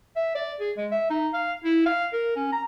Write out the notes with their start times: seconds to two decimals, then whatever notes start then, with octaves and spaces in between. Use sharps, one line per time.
0.16 E5
0.35 D5
0.60 G#4
0.77 G#3
0.92 E5
1.10 D#4
1.34 F5
1.64 E4
1.86 F5
2.13 A#4
2.36 C#4
2.53 A#5